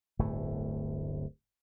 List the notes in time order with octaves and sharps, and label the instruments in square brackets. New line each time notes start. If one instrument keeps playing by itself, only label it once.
[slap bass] D1 G1 A2 A3